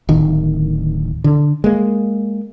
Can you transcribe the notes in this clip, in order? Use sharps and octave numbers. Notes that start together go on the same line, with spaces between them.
D1 D#3
D3
G#3 A#3